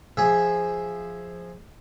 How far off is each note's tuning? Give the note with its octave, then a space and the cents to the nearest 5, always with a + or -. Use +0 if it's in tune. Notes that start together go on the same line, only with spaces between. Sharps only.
F3 +0 G#4 +0 E5 -5